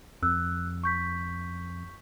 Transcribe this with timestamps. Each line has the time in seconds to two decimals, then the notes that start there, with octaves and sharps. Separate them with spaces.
0.23 F2 E6 F#6
0.84 C#6 G6 B6